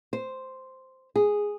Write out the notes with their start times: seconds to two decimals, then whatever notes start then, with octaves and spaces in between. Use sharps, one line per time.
0.13 C5
1.16 G#4